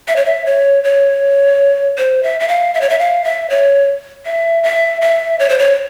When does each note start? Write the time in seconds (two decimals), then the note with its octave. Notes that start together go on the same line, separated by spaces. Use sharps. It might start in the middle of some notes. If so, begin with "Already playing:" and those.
0.08 E5
0.16 C#5
0.25 E5
0.46 C#5
0.84 C#5
1.98 C5
2.23 E5
2.40 E5
2.48 F5
2.74 E5
2.81 C#5
2.90 E5
2.99 F5
3.24 E5
3.50 C#5
4.25 E5
4.64 E5
5.02 E5
5.39 C#5
5.49 C5
5.59 C#5